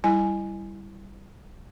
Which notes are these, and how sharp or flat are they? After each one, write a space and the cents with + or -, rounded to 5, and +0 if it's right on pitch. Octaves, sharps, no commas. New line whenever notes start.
G3 +0 E4 +0 G#5 +0